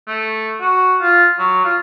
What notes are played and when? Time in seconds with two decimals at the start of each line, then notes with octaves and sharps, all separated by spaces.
0.07 A3
0.60 F#4
1.01 F4
1.39 F#3
1.65 F4